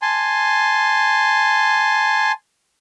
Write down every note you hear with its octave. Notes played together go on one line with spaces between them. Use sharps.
G#5 A5 C6